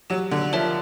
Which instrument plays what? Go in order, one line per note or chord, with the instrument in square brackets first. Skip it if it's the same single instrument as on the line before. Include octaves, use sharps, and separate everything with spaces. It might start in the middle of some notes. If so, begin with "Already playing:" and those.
[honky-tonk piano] F#3 [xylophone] G4
[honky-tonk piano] D3
[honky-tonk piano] F3 [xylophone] A#4 C#5 E5 A5